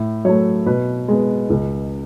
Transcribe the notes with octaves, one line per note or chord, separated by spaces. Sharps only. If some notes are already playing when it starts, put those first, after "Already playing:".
Already playing: A2
F#3 A3 C#5
B2 B4
G#3 B3
C#2